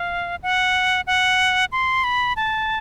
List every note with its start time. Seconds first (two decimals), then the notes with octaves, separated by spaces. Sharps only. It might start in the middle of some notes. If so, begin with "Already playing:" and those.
Already playing: F5
0.43 F#5
1.07 F#5
1.72 C6
2.04 B5
2.36 A5